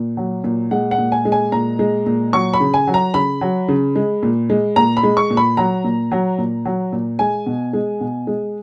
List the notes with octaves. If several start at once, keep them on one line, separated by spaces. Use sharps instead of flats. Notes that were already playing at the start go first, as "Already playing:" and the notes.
Already playing: A#2
F#3
A#2
G#3 F#5
F#5
A#2
G#5
G#3
G#5
A#2 A#5
G#3
A#2
F#3 C#6
B5
C#3
G#5
F#3
A#5
C#3 B5
F#3
C#3
G#3
A#2
G#3
A#2 A#5
B5
G#3
C#6
A#2
B5
F#3 A#5
A#2
F#3
A#2
F#3
A#2
G#3 G#5
B2
G#3
B2
G#3